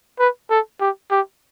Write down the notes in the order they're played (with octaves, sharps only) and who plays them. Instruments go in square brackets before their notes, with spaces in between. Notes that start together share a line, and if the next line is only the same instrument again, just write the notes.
[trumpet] B4
A4
G4
G4